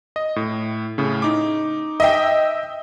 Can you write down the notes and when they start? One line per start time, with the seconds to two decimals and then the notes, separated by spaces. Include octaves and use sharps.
0.16 D#5
0.36 A2
0.98 A2 C#3
1.22 D#4 D6
2.00 D#5 E5 G5